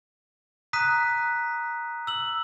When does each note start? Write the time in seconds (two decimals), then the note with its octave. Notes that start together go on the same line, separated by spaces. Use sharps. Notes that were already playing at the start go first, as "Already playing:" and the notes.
0.73 A#5 D#6 F#6 B6 D#7
2.07 E6 F#7